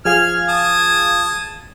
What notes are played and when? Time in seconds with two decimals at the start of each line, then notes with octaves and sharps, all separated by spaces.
0.05 F3 G#4 F5 F6 G#6
0.49 A5 D#6